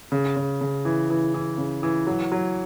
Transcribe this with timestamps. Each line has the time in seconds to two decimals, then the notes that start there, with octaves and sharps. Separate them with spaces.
0.12 C#3
0.36 C#3
0.61 C#3
0.85 E3
1.10 E3
1.34 E3
1.58 C#3
1.83 E3
2.07 F#3
2.32 F#3